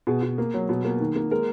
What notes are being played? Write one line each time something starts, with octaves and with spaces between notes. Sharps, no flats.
B2 G#4
B2
A#3
F#3
B2
A#3
D#3
A#3
G#3 A#4